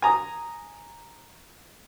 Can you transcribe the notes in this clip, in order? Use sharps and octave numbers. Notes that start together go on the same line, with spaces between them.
G#5 A#5 D#6